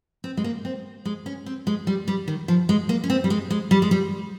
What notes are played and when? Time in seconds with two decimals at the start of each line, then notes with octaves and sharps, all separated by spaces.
0.24 C4
0.37 G#3
0.44 A#3
0.65 C4
1.05 G#3
1.26 C#4
1.46 C4
1.67 G#3
1.87 G3
2.08 G3
2.28 D#3
2.48 F3
2.69 G#3
2.89 A#3
3.04 C#4
3.10 C4
3.24 G3
3.30 G#3
3.51 G#3
3.71 G3
3.82 G#3
3.91 G3